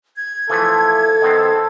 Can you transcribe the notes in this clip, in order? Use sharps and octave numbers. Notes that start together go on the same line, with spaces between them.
G#6
E3 F3 A3 A4
D#3 B3 C4